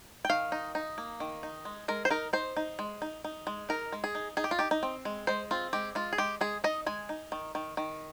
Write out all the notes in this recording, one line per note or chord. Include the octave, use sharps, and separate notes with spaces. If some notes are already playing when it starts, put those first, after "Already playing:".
G5
D#3 F5
D#4
D#4
A#3
D#3
D#4
G#3
G#3 A#4
C5
D#4 A#4
D#4 C5
D#4
G#3
D#4
D#4
G#3
D#4 A#4
G#3
G#4
D#4
D#4 G#4
G4
F4
D#4 G4
D#4
C4
G#3
G#3 C5
C4 F4
G#3 G4
G#3 F4
G#4
G#3 G4
G#3 G#4
D#4 D#5
G#3 G#5
D#4
D#3
D#3
D#3